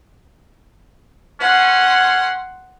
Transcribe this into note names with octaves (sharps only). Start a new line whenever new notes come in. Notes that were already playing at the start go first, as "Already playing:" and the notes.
C#4 F#5 C6